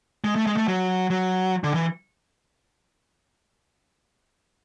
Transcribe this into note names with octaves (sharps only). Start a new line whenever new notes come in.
G#3
A3
G#3
A3
F#3
F#3
D3
E3